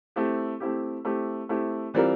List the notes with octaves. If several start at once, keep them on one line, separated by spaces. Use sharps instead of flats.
A3 C4 E4 G4
A3 C4 E4 G4
A3 C4 E4 G4
A3 C4 E4 G4
E3 G3 C4 F4 A#4